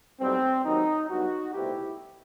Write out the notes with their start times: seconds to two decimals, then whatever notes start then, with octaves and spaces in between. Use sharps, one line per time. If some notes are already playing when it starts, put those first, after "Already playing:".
0.20 B1 A2 G3 C4
0.64 D#2 D#3 F#3 C4 D#4
1.10 G2 F#3 B3 D#4 F#4
1.54 C2 B2 A3 C4 E4 G4